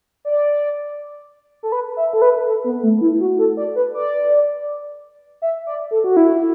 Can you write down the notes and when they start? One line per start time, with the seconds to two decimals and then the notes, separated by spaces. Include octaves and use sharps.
0.25 D5
1.63 A4
1.72 B4
1.97 E5
2.13 A4
2.22 B4
2.47 A4
2.64 B3
2.83 A3
3.01 E4
3.20 F#4
3.39 A4
3.57 D5
3.76 B4
3.95 D5
5.42 E5
5.67 D5
5.91 A4
6.04 F#4
6.17 E4